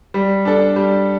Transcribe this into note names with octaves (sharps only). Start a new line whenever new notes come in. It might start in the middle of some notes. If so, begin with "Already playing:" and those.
G3
D4 A4
G3